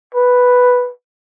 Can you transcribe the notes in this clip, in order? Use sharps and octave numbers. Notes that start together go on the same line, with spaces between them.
B4